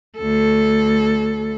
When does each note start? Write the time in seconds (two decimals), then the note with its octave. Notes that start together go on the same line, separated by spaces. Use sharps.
0.18 D2 A4